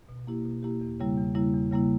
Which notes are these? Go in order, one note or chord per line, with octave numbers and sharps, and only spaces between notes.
B2
A#3 E4 G4
B2
A#3 E4 G4
E2
C#3 G3 A#3 E4
E2
C#3 G3 A#3 E4
E2
C#3 G3 A#3 E4